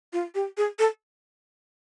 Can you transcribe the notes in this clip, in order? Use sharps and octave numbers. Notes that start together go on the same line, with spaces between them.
F4
G4
G#4
A4